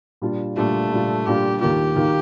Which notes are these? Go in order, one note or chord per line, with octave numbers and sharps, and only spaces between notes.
A#2 G3 D4 F4
A#2 G3 A3 D4 F4
A#2 G3 D4 F4
A#2 G3 D4 F4 G4
D#2 D#3 A#3 F4 G4
D#2 D#3 A#3 F4